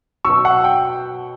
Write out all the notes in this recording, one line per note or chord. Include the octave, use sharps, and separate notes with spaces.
B2 F#3 C#6 E6
F#5
G5